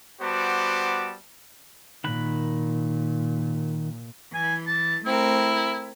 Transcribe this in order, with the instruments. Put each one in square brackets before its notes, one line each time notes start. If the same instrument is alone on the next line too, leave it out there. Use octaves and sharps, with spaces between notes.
[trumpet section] G3 B3 F#4 C5 A5 D6
[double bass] A#2 [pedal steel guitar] D#3 B5 F#6
[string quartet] E3 [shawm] G#5
[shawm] A5
[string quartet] A3 C4 A#4 [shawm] E4